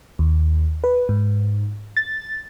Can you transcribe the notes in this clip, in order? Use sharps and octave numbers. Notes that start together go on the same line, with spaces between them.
D#2
B4
G#2
A6